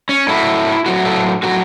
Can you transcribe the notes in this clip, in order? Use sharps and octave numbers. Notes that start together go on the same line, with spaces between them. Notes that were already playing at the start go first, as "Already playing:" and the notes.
C#4
A2 F#3 E4
A2 F#3 F#4
A4
A2 F#3 F#4